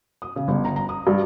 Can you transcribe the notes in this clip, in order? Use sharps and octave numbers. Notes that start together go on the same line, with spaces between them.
D#6
C#3
G1
A#5
A#5
D#6
G2